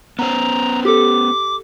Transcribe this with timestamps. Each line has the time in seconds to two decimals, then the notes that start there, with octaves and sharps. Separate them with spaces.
0.19 B3 C#4 C5 A#5
0.85 G4 A4 D6